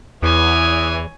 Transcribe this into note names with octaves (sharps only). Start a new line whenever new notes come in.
E2 E3 C#5 G#5 D#6